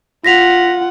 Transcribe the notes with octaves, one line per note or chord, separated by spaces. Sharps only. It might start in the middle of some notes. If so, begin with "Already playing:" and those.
F4 F#5 A#6 B6 F7